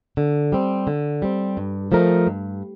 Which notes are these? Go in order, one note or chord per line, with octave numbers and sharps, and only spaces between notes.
D3
G3 C4
D3
G3 C4
G2
F3 A3 D#4 A#4
G2